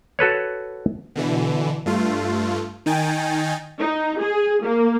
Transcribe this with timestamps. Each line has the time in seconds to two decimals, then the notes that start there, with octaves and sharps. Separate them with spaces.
0.19 F#4 A4 B4 C#5
1.15 B2 D3 E3
1.86 G2 A3 F4
2.86 D#3 D#4 G5 G#5 A6
3.80 D#4
4.20 G#4
4.64 A#3